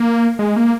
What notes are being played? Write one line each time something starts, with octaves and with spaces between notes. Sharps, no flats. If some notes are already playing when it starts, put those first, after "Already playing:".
Already playing: A#3
G#3
A#3